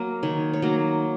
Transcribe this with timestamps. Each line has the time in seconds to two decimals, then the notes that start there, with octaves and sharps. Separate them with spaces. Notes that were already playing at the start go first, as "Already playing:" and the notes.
Already playing: F#3 A#3 A#4
0.23 D#3 C#5
0.53 C#5
0.62 F#3 A#3 A#4